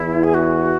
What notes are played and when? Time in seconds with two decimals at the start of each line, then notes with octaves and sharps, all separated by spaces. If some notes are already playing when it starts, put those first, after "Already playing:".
Already playing: E2 E4
0.23 G#4
0.34 F#4